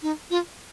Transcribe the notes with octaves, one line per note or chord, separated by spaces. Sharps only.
D#4
F4